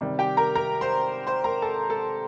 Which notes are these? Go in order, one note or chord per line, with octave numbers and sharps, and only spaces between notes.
C3 D#3 G3
G4 G5
A#4 A#5
A#4 A#5
C5 C6
C5 C6
A#4 A#5
A4 A5
A4 A5